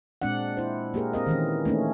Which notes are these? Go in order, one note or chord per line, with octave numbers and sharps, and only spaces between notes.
A#2 G#3 C4 D4 D5 F#5
E4 C5
A#3 G4 G#4 A#4
C4 A#4 D#5
D#3 E3 C#4
A3 A#3 C#4 D#4